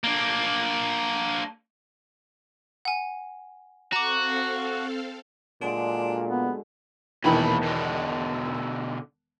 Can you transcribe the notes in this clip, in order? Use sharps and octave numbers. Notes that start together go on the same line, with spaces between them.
A#3 D4
F#5 G#5
C4 F#4 A4 F5 A#5 D6
A#2 D3 F#3 G#3 D4
B3
E1 A#2 D#3 E3 B5
B2 D3